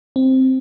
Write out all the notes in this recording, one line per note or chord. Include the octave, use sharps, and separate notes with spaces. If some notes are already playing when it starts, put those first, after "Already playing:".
C4